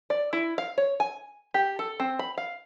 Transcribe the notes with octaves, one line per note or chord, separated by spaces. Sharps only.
D5
E4
F5
C#5
G#5
G4
A4
C4
B5
F5